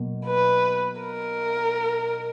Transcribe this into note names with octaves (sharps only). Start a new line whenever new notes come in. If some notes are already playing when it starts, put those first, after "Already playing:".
Already playing: B2 F#3 A#3
B4
A#4